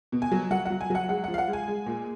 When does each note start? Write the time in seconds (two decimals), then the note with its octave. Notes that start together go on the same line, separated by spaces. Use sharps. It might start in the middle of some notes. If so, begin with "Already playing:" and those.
0.12 B2
0.22 G#5
0.31 F#3
0.51 F#3 F#5
0.65 F#3 F#5
0.81 G#5
0.90 F#3 F#5
1.09 G#3 F#5
1.24 F3 F#5
1.34 F5
1.38 F#5
1.48 G#3
1.53 G#5
1.68 G#3
1.86 A#2